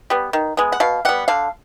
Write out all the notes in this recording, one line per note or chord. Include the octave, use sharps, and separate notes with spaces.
G3 B3
D#3
G#3 B3
F#5
B2 F5
G3 B3 F#5
D3 F5